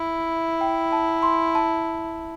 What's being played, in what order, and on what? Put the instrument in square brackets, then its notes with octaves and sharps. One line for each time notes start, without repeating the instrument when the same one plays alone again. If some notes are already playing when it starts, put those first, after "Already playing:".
Already playing: [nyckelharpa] E4 [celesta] E5
[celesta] G5
A5
C6
A5